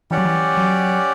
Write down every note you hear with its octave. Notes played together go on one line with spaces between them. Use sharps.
E3 C#4 G4 D5 F#5
F#3
E3
F#3